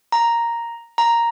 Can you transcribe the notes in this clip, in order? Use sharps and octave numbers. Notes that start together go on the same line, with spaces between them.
A#5
A#5